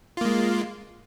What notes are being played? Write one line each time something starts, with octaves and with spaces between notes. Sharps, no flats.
G#3 A#3 F4